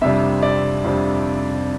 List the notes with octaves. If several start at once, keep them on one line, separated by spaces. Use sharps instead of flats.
F2 C3 G3 D4 E5
D5
F2 C3 G3 D4